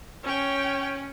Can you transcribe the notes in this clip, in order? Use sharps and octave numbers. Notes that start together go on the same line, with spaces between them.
C#4 C#5 G5